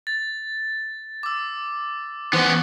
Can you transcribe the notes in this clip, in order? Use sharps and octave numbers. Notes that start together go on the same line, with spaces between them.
A6
D6 E6
E3 B3 C#4